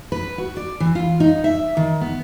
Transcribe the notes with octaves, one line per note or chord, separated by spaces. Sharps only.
B4
F#4
D5
E3
F4
D#4
E5
D#3
B3